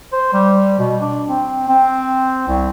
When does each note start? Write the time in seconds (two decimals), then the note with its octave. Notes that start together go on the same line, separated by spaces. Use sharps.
0.13 C5
0.33 G3
0.79 B2
1.01 D4
1.30 C4
1.69 C4
2.48 C2